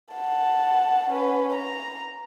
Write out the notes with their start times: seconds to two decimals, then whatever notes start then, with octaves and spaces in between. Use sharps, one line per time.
0.15 F#5 A5
1.10 C#4 B4
1.55 A#5